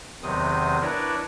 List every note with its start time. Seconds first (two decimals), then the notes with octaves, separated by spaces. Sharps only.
0.23 E2 C3 D#3 F#3 C4 D#6
0.82 D4 E4 A#4 B4 C#5 D5